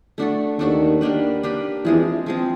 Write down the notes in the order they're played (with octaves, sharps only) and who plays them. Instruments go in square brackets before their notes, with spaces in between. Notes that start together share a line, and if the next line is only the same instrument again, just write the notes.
[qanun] A3 D4 F#4 A4
[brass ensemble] D#2 D#3 [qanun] A3 D4 F#4 A4
[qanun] A#3 D4 G4 B4
A#3 D4 G4 B4
[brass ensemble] E2 E3 [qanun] F3 G#3 C4
[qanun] F3 G#3 C4